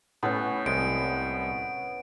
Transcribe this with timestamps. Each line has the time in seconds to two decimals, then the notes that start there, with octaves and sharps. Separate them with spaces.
0.23 A2 B3 C#4
0.66 C2 G#3 D7